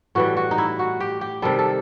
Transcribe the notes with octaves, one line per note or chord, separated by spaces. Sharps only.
A2 E3 G3 F#4
F#4
D#4
E4
F#4
G4
G4
C3 D#3 G3 A4
A4